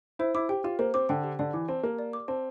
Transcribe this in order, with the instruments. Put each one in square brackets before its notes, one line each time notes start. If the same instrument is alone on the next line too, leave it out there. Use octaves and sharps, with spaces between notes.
[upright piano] E4 [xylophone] C5
[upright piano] E4 [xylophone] D6
[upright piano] G4 [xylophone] G5
[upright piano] F4 [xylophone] G4
[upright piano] A#3 [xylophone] C5
[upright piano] C4 [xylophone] D6
[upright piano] D3 [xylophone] G5
[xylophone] G4
[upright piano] D3 [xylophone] D5
[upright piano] E3 [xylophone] D6
[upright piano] C4 [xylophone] A5
[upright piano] A#3 [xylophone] G4
[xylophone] D5
D6
[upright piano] C4 [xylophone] A5